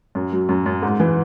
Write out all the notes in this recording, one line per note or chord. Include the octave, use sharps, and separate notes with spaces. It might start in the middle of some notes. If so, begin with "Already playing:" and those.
F#2
F#3
F#2
F#2
G#2
E3